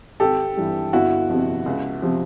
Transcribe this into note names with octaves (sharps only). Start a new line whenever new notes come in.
G#1 G4 A4
G2 E3
G1 E4 F#4
F2 C3
C#2
C3 F3